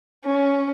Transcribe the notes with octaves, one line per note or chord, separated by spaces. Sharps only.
C#4